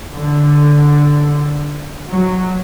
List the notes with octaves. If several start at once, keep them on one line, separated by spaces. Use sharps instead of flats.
D3
F#3